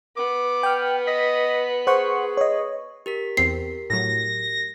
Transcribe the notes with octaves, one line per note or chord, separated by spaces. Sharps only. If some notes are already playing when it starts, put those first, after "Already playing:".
B3 D6
G5 F6
D#5 B6
G#4 C5 F#5 C#6
C#5 D#5
G4 A#4 B6
E2 C4 C7
A2 F#3 A#6